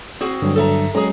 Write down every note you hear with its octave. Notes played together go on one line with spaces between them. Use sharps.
C4 F#4 G#4
G2 D3 F#3
A4 E5 A#5
F#3 G#3 C#4 G#4 A#5